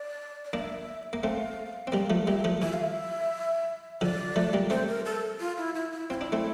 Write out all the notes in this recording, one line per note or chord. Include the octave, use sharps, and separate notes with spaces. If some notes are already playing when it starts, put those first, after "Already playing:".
Already playing: D5
D5
A#3 D4 F5
E5
A#3
A3 C4 F5
C4
G3 A#3 F5
F3 A3
G3 A#3 E5
F3 A3
E3 E5
F5
E5
D3 F3 D5
F3 A3
G3 A#3
A3 C4 C5
A#4
A4
F4
E4
E4
E4
C4 E4 F4
D4
A3 C4